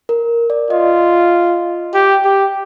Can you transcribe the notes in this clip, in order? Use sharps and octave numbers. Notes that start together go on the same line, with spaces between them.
A#4
D5
F4 D#5
G4
G4